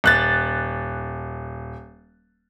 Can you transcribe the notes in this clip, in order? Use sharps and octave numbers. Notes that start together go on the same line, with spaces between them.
D#1 F#6 A6